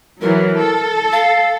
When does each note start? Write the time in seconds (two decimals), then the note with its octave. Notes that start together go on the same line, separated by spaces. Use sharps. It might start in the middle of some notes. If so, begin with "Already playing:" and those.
0.21 E3 F#3 A#4
0.60 A4
1.13 F5